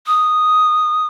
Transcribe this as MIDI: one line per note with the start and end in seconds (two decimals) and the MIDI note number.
0.07 1.07 87